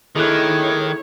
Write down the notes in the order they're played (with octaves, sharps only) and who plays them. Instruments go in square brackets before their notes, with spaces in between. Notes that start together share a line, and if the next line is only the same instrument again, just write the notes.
[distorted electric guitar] D#3 [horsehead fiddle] E4 C#5 [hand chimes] G#4 A4 F#6